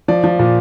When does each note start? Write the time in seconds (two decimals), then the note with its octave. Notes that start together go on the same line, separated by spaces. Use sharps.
0.08 F3 D5
0.24 F3
0.39 A#2